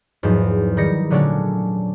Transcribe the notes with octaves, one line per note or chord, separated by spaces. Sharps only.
E2 G#2 F3 F#3
D#3 G3 A#6 C#7
A#2 D3 F#3 A3 C#4 D4